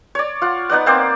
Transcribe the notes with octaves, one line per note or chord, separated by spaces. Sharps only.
C#5 D5
F4 F#5
B3 D#4 D5 F#5
A#3 C4 C5 D5